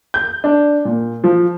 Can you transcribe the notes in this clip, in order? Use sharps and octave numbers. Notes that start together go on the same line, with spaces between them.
G6
D4
A#2
F3